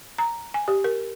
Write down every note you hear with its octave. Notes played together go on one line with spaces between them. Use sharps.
A#5
G#5
G4
A#4